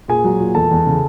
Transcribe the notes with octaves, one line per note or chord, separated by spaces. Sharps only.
A#2 G#4 G#5
F#3
A#2
E2 A4 A5
E2
C#3